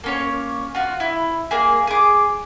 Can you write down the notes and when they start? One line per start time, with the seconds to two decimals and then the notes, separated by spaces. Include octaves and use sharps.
0.04 A#3 C#4 C#5
0.75 F4 F#4
1.00 E4
1.51 A#3 G#4
1.87 G#4 D6